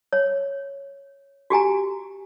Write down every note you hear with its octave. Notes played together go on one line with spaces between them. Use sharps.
C#5
F#4 G4 G#5 A#5